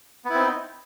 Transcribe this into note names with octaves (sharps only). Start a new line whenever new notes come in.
B3 C4 D#4 E4